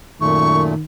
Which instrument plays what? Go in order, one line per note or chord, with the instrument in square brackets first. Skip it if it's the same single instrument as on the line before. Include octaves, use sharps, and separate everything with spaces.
[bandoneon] F#2 A#2 A3 [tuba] D#3 [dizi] C#6